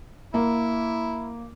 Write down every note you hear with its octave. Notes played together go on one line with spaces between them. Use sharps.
A#3 E4